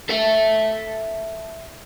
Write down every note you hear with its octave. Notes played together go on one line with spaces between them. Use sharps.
A4 E5